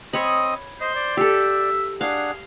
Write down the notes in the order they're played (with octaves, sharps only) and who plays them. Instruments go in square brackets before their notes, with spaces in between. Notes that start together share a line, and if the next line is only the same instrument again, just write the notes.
[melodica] C4 D#5 D#6 [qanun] C#5 B5
[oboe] C5 [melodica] D#5
[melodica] D5
[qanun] G4 A4 [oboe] E5
[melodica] D4 F#5 [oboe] G#4 [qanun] F5